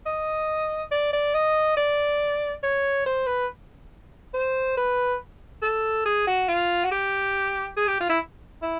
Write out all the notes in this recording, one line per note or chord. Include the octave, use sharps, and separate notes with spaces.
D#5
D5
D5
D#5
D5
C#5
C5
B4
C5
B4
A4
G#4
F#4
F4
F#4
G4
G#4
G4
F4
E4
E4